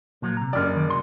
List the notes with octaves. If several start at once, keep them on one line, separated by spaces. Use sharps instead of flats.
A#2 F3 F#3
C3 A#5
F#1 G3 G4 A#4 D5
D#3
C2 F#4 C6